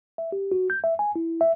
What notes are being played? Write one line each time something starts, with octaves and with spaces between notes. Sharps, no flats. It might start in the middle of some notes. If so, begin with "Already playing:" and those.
E5
G4
F#4
G6
E5
G#5
E4
E5